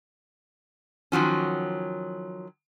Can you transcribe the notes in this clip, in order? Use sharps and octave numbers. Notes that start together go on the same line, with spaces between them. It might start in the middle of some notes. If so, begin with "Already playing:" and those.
D#3 F3 F#3 C#4